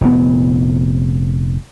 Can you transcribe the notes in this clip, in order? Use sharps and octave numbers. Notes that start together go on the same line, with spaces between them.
F1 A#2 B3